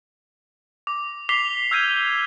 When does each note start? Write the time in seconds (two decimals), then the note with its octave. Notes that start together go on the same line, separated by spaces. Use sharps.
0.87 D6
1.29 D6 B6 C7 F7 G7
1.71 E6 F6 G6 G#6 B6 D#7